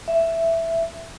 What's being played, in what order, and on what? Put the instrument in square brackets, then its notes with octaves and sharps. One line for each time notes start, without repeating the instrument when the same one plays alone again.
[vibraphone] E5